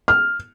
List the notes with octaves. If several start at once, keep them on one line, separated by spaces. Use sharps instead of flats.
F6